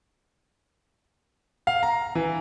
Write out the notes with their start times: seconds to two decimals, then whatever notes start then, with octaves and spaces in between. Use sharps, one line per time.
1.67 F5
1.83 A#5
2.15 E3